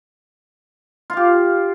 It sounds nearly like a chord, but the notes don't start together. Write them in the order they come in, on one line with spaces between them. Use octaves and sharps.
F4 F5 G4